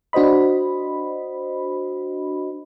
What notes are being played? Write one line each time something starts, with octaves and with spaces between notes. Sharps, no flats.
D4 F#4 C5 D#5 B5